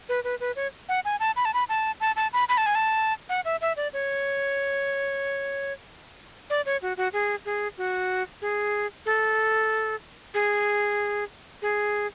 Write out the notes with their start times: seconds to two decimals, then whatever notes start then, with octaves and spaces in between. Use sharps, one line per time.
0.09 B4
0.24 B4
0.40 B4
0.56 C#5
0.89 F#5
1.05 G#5
1.20 A5
1.36 B5
1.45 A5
1.54 B5
1.69 A5
2.00 A5
2.16 A5
2.33 B5
2.49 B5
2.57 A5
2.66 G#5
2.75 A5
3.29 F#5
3.45 E5
3.61 E5
3.77 D5
3.93 C#5
6.50 D5
6.66 C#5
6.82 F#4
6.97 F#4
7.13 G#4
7.45 G#4
7.78 F#4
8.42 G#4
9.06 A4
10.34 G#4
11.62 G#4